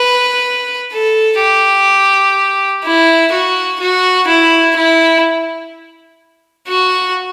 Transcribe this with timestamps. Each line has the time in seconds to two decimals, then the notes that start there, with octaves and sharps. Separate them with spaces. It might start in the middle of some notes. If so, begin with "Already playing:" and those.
Already playing: B4
0.92 A4
1.40 G4
2.84 E4
3.32 F#4
3.80 F#4
4.28 E4
4.76 E4
6.68 F#4